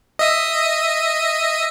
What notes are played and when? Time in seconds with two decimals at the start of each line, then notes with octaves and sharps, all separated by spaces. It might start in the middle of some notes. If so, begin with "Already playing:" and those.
0.19 D#5 E5 D#6